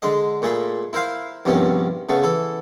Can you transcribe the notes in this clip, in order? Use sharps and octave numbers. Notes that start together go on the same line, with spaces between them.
D3 G#3 D#5
A#2 A3 G#4 B5
E4 A#4 C5 F5
A#1 G2 C3 D#3 B3 C#4
C#3 A3 B3
E3 A4